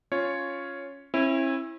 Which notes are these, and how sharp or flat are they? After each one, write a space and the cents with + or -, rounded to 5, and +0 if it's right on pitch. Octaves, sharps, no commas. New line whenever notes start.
C#4 +5 F4 +0 C#5 +0
C#4 -45 E4 +0